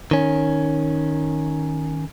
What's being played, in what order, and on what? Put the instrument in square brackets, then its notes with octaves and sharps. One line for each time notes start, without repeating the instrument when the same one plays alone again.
[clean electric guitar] D#3 C#4